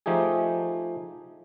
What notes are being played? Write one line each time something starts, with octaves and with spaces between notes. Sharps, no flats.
F3 A3 D#4 G4 G#4